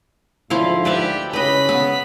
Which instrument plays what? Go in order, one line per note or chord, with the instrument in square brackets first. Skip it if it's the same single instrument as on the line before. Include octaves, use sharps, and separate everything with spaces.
[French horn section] D2 G#2 [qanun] F3 E4 F5
[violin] G4 [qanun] B4 D5 E5
[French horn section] C#3 C#5 [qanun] B4 D#5 [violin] B5 B6
[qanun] B3